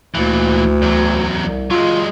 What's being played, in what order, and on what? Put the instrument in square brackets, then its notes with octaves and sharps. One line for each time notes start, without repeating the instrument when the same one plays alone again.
[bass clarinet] D2 [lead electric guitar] A#2 E3
[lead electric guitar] E2 F#3
[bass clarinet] C2
[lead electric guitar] F#3 G#3 [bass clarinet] F4